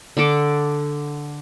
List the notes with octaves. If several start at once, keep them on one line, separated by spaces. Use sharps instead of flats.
D3 D4 A4 D6